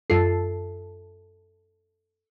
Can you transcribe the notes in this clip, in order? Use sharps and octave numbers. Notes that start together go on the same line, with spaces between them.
F#2 F4 A4 C7